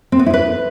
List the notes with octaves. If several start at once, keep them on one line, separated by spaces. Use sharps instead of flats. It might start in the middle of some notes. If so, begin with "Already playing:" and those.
C4
B3
E4
B4